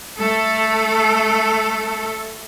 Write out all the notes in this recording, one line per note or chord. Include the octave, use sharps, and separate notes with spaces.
A3 A4